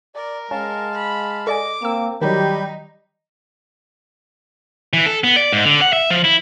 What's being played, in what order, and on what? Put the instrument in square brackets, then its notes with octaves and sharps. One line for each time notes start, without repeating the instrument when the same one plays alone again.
[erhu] A#4 [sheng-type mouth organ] D5
[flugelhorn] G#3 [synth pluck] C#4 [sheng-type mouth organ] F5 A5
[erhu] B5
[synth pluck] A4 D5 G#5 [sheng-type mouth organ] D#5 [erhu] D6
[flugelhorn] A#3 [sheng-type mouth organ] C4 [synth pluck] E6 E7
[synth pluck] D#3 F#3 [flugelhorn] G3 [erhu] D#4 [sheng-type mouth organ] G4 B5 G6
[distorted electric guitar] E3
A4
B3
D5
G#2
D3
F#5
E5
F3
E4